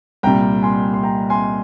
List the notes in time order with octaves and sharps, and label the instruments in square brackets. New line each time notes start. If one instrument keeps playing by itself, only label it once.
[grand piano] C2 A#2 G3 G5 A#5
G#5 C6
C6
G5 A#5
G#5 C6